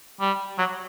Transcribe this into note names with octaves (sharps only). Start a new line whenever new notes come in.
G3
F#3